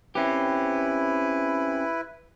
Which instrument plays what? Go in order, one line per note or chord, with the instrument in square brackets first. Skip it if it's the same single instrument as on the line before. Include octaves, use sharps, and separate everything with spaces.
[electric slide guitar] C4 C#4 G4 [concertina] E4 B4